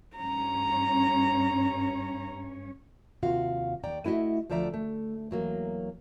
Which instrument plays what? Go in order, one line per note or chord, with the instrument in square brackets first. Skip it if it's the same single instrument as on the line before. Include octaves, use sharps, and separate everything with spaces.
[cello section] G2 C#4 C#5 [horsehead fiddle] A#5
[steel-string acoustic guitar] D#2 C3 F4 F#4 F5
D#2 D5 G5 A#5
A3 E4 F#4 D#5 E5
D2 F3 A3 D5 E5 A#5
A3
E2 F#3 A#3